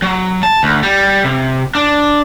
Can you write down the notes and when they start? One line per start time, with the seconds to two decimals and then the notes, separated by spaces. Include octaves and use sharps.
0.02 F#3
0.43 A5
0.63 D2
0.83 G3
1.24 C3
1.75 D4